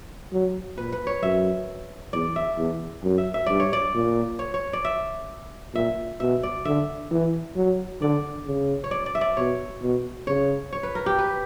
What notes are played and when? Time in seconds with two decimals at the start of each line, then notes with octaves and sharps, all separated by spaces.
0.32 F#3
0.77 A#2 B4
0.92 B4
1.07 C#5
1.23 F#2 E5
2.13 E2 D5
2.36 E5
2.58 E2
3.03 F#2
3.18 E5
3.34 E5
3.46 G2 D5
3.60 C#5
3.73 D5
3.94 A#2
4.39 C#5
4.54 C#5
4.73 D5
4.85 E5
5.74 A#2 E5
6.20 B2 E5
6.43 D5
6.65 D3 E5
7.11 E3
7.56 F#3
8.01 D3 D5
8.47 C#3
8.84 C#5
8.91 D5
9.06 D5
9.15 E5
9.21 D5
9.37 B2 C#5
9.82 B2
10.27 C#3 C#5
10.73 C#5
10.83 B4
10.95 A#4
11.06 G4
11.18 B4